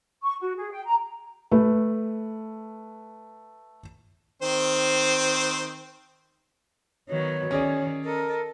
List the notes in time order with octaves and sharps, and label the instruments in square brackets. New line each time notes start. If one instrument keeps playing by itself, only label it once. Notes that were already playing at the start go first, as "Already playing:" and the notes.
[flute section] C#6
F#4
G#4
G5
A#5
[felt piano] A3 B4
[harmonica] D#3 C4 C5
[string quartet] D#3 F#3 B3 [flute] C#5
[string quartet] D#3 [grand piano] C#4 G#4 D5
[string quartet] A4 D#5 [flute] A#4